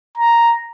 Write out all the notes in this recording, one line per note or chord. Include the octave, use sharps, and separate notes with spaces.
A#5